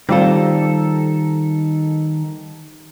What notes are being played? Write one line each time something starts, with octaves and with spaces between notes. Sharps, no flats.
D#3 G3 C4 F4 A4 C5